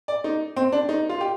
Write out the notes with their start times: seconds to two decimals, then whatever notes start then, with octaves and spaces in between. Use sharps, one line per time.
0.08 D5
0.24 D#4
0.56 C4
0.73 D4
0.89 D#4
1.09 F4
1.21 G4